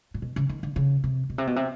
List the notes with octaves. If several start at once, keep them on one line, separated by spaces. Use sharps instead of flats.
A#2
B2
C#3
D#3
D3
C#3
C3
B2
C3
B2
C3